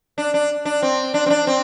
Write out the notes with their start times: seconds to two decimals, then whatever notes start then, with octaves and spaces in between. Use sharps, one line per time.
0.18 D4
0.34 D4
0.65 D4
0.82 C4
1.14 D4
1.26 C4
1.30 D4
1.47 C4